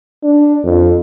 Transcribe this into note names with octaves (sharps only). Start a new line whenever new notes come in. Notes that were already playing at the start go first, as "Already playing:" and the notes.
D4
F2